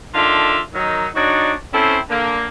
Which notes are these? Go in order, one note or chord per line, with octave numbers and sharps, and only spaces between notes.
D3 D#3 F4 A4 D5 E5
D#3 F#3 D#4
D4 D#4 F#4 C#5 D5
C4 C#4 E4 A4 C5
D3 A#3